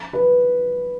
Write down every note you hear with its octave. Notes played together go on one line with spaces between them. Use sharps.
B4